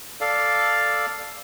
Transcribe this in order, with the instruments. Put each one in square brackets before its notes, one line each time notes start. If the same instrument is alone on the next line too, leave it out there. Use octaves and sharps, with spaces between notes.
[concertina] A4 D5 F5